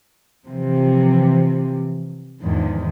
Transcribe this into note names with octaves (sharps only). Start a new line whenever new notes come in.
C3 E3 F3
E2 G#2 D3 D#3 F3